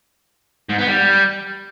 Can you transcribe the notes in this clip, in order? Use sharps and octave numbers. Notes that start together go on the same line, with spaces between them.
G#2
B3
G3